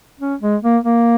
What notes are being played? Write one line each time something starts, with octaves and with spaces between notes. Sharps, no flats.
C#4
G#3
A#3
A#3